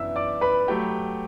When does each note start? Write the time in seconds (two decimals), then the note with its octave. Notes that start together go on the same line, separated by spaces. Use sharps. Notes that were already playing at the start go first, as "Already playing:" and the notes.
Already playing: F#2 E3 B3 D4 E5 E6
0.16 D5 D6
0.41 B4 B5
0.68 F#3 A3 G4 G5